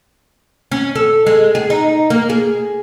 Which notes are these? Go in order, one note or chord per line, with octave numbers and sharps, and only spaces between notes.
C#4
A4
G#3
G#4
D#4
A#3
G#4